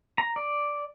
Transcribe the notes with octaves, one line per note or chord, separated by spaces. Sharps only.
A#5
D5